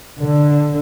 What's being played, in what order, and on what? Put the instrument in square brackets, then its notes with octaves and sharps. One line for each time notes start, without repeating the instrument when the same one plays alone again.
[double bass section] D3